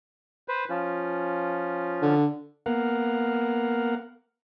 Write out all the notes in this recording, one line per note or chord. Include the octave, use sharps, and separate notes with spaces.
B4 C5
F3 C#4 F4
D3
A#3 B3 A#4 F5 F#5